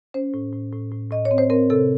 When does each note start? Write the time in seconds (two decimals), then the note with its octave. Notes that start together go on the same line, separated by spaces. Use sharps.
0.14 C#4 C5
0.34 A2
0.53 A2
0.73 A2
0.92 A2
1.11 A2 D#5
1.25 C#5
1.31 C4
1.38 C5
1.50 C4 A#4
1.70 C3 A4